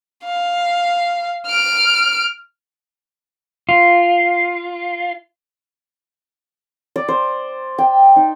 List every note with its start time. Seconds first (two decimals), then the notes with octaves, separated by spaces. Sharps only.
0.24 F5
1.46 F6 D7
3.69 F4
6.96 D5
7.08 C5
7.78 G5
8.16 D#4